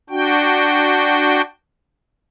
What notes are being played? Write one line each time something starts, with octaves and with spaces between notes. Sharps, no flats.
D4 F#4 G5